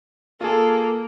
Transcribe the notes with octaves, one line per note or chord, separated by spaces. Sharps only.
A#3 F4 G#4 A4